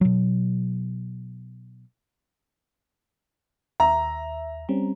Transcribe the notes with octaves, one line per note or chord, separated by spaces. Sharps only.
B2 F#3
D#2 E5 A#5
G3 C4 C#4